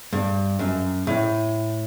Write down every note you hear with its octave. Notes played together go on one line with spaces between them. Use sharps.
G2
F#2
A2